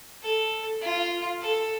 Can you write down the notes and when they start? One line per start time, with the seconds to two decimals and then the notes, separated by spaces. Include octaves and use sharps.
0.23 A4
0.81 F4
1.41 A4